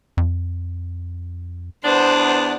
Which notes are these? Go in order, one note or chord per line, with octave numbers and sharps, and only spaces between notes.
F2
E2 B3 D4 C5